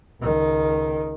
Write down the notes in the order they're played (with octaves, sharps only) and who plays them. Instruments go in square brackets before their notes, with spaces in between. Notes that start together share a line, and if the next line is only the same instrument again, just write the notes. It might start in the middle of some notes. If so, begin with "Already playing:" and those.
[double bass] C#2 D#3